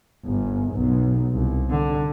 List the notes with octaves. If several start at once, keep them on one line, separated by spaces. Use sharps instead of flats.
G1
B1
C2
D3